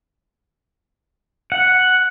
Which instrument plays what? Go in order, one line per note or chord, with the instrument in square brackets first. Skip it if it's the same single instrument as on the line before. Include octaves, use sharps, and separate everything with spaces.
[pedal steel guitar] F#5